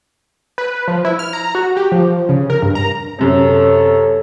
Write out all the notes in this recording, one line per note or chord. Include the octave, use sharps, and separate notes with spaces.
B4
F3
E4
F6
A#5
F#4
G4
F3
C#3
A#4
G2
A#5
F#2 C3 A4 C#5